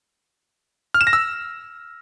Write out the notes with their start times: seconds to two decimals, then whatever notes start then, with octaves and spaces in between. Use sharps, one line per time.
0.94 F6
1.01 E7
1.07 A#6
1.13 E6